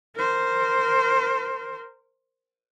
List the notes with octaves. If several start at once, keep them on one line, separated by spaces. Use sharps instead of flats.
A#4 C5